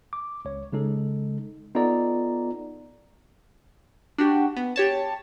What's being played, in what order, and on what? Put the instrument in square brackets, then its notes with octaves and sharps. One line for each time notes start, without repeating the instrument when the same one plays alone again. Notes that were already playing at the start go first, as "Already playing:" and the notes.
[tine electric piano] D6
C#2 C#5
C#3 G#3 D#4 A4
B3 D#4 F4 A4 D5 A#5
[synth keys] D4 F#4 G4
B3
G4 C#5 A5